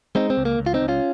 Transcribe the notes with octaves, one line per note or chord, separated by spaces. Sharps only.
G#3 C4 D#4
C4
C#2
A#3
C#2
F4
C4 D#4
C#2
C#4 F4